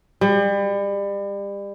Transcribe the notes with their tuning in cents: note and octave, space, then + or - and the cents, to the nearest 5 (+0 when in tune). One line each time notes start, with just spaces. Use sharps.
G3 +35